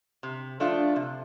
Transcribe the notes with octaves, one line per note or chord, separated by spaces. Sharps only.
C3
F3 A3 D4 F4
C3